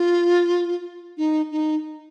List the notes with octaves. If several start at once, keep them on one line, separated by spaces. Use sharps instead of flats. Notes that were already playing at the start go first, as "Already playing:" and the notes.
Already playing: F4
D#4
D#4